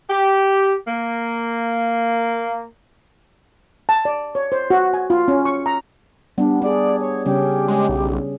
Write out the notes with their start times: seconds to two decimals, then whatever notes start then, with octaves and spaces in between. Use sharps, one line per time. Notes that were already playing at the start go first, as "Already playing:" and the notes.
0.10 G4
0.88 A#3
3.89 A5
4.05 D5
4.35 C#5
4.52 C5
4.70 F#4
4.94 G#5
5.10 F4
5.28 C#4
5.45 C#6
5.66 A#5
6.38 G3 B3 D4
6.62 D4 G#4 D5
7.00 C#5
7.26 C#3 G3 C#4 G4
7.68 G#3
7.89 B1